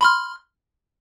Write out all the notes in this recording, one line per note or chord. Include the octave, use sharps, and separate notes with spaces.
B5 C6 F6